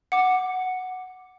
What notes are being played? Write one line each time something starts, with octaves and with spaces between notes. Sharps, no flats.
F#5 D6